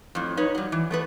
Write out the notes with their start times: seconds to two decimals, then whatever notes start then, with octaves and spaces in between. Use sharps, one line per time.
0.15 F2 A2
0.37 D#4 B4 C#5
0.55 F#3 G3
0.72 E3
0.91 A3 B3 B4